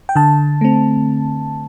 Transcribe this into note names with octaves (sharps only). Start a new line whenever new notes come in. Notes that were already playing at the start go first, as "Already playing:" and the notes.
G5
D3 A5
A3 C4